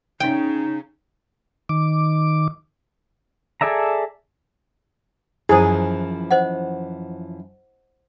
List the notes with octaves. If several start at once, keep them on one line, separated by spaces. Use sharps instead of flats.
C#3 D#4 G5
D#3 D6
G#4 A4 D5 E5 A#5
F#2 E3 F3 E4 G#4 C5
C5 D#5 F#5